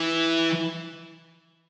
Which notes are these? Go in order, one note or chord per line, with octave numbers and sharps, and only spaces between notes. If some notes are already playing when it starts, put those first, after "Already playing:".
Already playing: E3